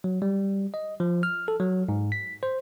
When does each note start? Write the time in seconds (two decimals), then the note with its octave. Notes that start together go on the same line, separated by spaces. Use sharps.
0.04 F#3
0.22 G3
0.74 D#5
1.00 F3
1.23 F6
1.48 A4
1.60 F#3
1.89 G#2
2.12 B6
2.43 C5